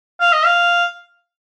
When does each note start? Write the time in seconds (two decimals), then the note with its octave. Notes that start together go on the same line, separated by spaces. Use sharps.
0.20 F5
0.33 D#5
0.45 F5